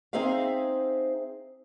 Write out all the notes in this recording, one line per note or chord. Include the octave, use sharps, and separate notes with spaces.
C4 D#4 G#4 C5 E5 F5